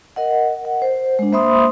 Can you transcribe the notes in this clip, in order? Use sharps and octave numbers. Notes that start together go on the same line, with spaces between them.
A#4 D#5 F#5
F#5
C5
G#3 D4
A#3 C5 E5 B5 C6 D#6